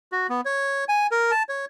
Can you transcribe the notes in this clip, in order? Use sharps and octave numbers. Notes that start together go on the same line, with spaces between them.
F#4
B3
C#5
G#5
A#4
A5
C#5